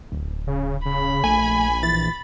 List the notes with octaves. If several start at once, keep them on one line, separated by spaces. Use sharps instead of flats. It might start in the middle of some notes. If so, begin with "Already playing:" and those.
D1
C#3
C#3 B5
A#1 A3 G#5
E3 A6